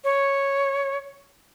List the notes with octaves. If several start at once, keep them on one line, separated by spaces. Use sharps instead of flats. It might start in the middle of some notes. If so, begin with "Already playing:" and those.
C#5